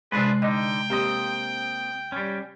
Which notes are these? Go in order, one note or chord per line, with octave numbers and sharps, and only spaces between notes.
C3 G#3 D4 F4 G#4 B4
D3 D#4 D#5 G5 D6
A#3 C4 G4 D#5
G3 C#4